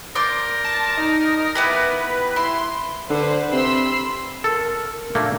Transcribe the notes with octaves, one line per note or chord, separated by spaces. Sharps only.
A#4 D5 C6 G6
A5
D#4
B3 E4 G4 B4
E4 C6
D3 B4 C5
C3 B5 C6 E6
A4 A#4
A#2 A3 A#3 D4